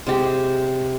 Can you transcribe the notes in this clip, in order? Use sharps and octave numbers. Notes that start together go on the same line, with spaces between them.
C3 G#3 G4